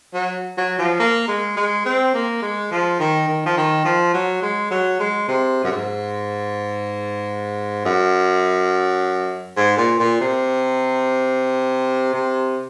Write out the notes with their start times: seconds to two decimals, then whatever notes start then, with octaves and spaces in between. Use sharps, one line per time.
0.14 F#3
0.57 F#3
0.78 F3
0.99 A#3
1.28 G#3
1.57 G#3
1.85 C4
2.14 A#3
2.42 G#3
2.71 F3
2.99 D#3
3.28 D#3
3.46 F3
3.57 D#3
3.85 F3
4.14 F#3
4.42 G#3
4.71 F#3
5.00 G#3
5.28 C3
5.63 F#2
5.71 G#2
7.85 F#2
9.57 G#2
9.77 A#2
9.99 A#2
10.21 C3
12.13 C3